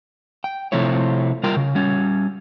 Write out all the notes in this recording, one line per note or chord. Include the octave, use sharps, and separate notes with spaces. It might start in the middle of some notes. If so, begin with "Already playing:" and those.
G5
C3 F3 A3 C4 E4 C#5
G3 F4 A#4 G5
C#3
G3 C#4